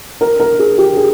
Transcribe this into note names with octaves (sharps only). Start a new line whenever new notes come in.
A#4
A#4
G#4
G4
G#4